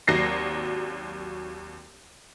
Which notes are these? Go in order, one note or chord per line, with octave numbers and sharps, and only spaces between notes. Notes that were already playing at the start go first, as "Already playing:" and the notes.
G#1 D#2 F#3 A#6 C7